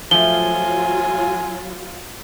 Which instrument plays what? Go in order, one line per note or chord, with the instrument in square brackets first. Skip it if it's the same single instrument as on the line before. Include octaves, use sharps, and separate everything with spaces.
[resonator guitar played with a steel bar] F3 A3 [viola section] F#3 F4 [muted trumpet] G#5 [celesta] G7